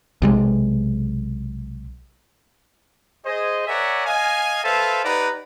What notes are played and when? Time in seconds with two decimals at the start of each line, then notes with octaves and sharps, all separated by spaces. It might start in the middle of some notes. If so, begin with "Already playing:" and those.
0.22 B1 C3 G#3
3.24 G#4 C5 D#5
3.67 A#4 C#5 D5 E5 F#5 G#5
4.06 D#5 F5 G#5
4.64 A4 B4 C5 E5 F5 A5
5.04 D#4 G4 B4 D5 F#5 A#5